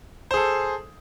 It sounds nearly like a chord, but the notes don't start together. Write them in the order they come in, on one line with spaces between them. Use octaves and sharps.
C5 G#4 A4